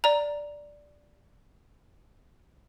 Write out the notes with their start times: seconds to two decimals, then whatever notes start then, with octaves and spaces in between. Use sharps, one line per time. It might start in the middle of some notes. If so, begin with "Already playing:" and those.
0.04 D5 A#5